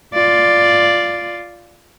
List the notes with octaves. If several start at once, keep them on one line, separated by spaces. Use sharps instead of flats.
F4 D5